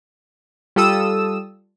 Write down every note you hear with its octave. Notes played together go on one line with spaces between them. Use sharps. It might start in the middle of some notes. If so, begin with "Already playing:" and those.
G3 F4 A4 D#6 E6 E7